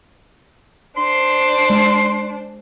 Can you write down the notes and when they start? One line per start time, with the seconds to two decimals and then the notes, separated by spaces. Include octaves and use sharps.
0.97 D4 C5 C6
1.70 G#3